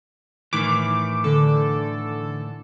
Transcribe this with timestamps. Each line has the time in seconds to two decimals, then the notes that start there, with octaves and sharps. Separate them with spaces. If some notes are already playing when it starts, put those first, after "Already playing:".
0.53 A2 D#3 E3 D6
1.24 D3 A4